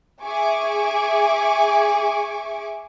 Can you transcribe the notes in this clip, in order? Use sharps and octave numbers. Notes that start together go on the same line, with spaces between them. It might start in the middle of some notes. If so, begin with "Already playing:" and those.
G#4 E5 G#5 C#6 D6